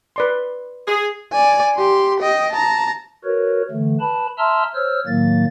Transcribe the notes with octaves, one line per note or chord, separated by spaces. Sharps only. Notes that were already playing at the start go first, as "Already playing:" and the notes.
B4 D5 C6
G#4
D5 G#5
G4 C6
D#5 G5
A5 A#5
F#4 A#4 B4 C#5
D3 E3 A3
B4 A5 B5
E5 A5 A#5 C6 E6 F6
C5 C#5 E6 F6
A2 D#3 F#3 A#3 A6